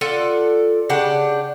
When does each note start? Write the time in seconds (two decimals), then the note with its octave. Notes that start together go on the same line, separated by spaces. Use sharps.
0.01 F4 A4 D5 F#5
0.89 C#3 D4 G4 F#5